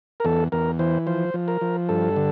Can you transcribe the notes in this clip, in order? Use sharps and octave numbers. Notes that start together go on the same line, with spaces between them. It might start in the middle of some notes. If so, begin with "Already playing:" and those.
A#4
E2 A4
E2 A#4
E3 C5
F3 C5
F3
A#4
F3
G2 A4
D3